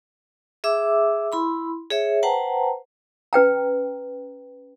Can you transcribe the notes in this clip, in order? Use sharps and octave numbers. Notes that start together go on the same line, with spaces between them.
G#4 E5 D6 E6
E4 B5 C6
G#4 C#5 E5
B4 C5 F#5 G5 A5 A#5
C#4 B4 G5 A#5